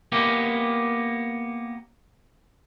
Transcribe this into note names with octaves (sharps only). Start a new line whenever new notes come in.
A#3 B3 G4